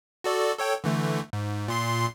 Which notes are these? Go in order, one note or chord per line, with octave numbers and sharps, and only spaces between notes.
F#4 A4 D5
A4 C#5 G5
D3 E3 A3
G#2
A#2 C6 C7